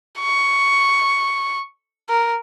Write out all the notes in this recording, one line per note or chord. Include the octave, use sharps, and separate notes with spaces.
C#6
A#4